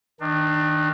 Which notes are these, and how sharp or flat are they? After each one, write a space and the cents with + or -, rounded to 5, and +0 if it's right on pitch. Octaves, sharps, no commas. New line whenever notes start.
D#3 +10 D4 +30